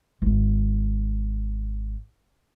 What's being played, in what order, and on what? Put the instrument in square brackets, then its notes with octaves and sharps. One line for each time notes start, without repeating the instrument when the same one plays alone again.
[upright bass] D#1 G#1